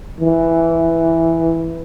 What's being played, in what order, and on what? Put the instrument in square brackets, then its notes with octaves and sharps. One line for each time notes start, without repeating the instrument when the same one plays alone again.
[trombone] E3